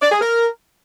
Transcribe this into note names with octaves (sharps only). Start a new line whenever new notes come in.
D5
G#4
A#4